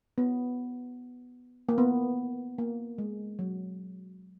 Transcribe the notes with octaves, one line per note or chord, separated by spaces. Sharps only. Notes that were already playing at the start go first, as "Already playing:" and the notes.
B3
A#3
B3
A#3
G#3
F#3